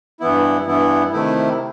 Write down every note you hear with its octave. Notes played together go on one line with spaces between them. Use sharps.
G2 E3 B3 E4
G2 E3 B3 E4
C3 D#3 A3 E4